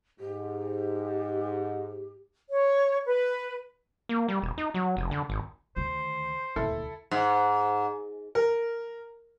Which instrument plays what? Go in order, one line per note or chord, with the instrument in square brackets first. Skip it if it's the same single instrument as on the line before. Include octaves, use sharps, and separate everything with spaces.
[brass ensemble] G#2 [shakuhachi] G4
[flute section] C#5
B4
[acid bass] A#3
G3
E1
D#4
F#3
F1
D3
G#1
[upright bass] D2 D#3 [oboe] C5
[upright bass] D#1 D2 [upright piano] E4 A4
[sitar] G#2
[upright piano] A#4